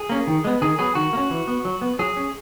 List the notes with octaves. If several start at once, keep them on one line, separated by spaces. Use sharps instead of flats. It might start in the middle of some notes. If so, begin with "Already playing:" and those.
Already playing: G#4
A#3 C#4
D#3
G#3 B3
D#3 G#4
F#3 B3 G#4
D#3 F#4
A#3
C#4
E3
B3
F#3
B3
F#3 G#4
C#4